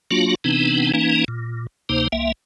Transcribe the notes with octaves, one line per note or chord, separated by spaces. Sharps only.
F#3 A#3 D4 F4 F#4
C3 E3 B3 C4 D4 D#4
E3 A#3 C#4 D#4
A#2
D2 C3 A#3 D#4 C5
C2 A#3 E5